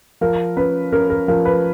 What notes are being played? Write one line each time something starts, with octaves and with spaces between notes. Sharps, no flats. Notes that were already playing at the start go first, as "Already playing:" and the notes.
F3 A#4
C#4 B4
C#4 A#4
A#4
F3 A#4
B4